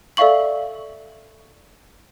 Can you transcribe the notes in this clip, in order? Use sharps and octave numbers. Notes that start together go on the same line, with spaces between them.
A4 D5 E5 F5 C#6 F#7